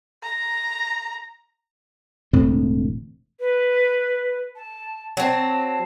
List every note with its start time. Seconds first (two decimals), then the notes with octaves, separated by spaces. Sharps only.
0.23 A#5
2.33 E1 A2 D3 C4
3.40 B4
4.56 A5
5.17 F#3 C4 A5